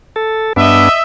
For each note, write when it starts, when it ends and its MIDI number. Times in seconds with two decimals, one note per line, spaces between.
0.16 0.53 69
0.56 0.89 43
0.56 0.89 59
0.56 0.89 62
0.56 1.03 75
0.56 1.03 76